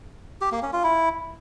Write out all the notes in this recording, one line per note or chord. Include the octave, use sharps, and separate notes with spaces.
G4
A#3
C#4
F4
E4